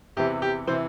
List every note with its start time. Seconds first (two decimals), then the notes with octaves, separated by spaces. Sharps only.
0.17 E2 C3 E3 G4
0.42 G4
0.67 C3 E3 C5